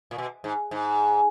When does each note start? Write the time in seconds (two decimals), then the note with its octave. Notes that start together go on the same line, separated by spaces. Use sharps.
0.11 A#2
0.18 B2
0.44 G#2
0.71 G#2